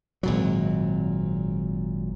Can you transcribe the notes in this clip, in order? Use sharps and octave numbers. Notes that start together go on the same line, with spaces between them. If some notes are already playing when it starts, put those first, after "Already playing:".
G#1 A#2 F#3